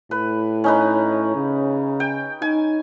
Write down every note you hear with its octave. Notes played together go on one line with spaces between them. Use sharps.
A2 B4
C#4 D#4 B4
C#3
G5
D#4 G#5